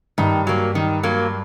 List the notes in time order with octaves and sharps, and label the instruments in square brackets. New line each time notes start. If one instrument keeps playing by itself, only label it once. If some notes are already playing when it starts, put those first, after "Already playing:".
[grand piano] G2 [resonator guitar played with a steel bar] D#3
[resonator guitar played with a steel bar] F#3 A#3
D#3
F#3 A#3